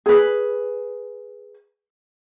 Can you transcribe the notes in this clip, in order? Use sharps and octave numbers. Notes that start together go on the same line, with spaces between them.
G#4 B4